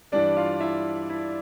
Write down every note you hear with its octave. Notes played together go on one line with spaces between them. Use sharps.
G2 E3 G3 D4 D5
F4 F5
E4 E5
E4